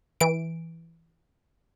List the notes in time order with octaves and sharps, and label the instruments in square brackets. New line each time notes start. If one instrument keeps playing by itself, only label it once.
[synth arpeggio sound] E3 D7